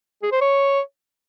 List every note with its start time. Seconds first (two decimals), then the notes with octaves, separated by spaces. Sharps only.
0.23 G#4
0.32 C5
0.41 C#5